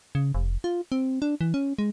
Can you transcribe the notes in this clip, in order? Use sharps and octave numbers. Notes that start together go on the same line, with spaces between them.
C#3
F1
F4
C4
D4
E3
C#4
G#3